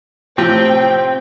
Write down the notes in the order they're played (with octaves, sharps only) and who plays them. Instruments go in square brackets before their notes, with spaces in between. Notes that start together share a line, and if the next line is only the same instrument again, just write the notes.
[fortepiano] A2 C3 F3 [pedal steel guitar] C4 [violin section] G5